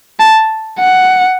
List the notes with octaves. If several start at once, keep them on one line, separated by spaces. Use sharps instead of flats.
A5
F#5